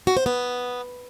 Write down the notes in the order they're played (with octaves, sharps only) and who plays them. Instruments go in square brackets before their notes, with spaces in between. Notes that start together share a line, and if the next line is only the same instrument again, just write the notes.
[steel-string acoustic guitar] F#4
C5
B3